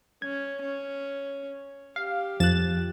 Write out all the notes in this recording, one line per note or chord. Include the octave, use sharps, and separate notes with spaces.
C#4 G#6
C#4
G4 F5
F2 F3 F#6 A6 E7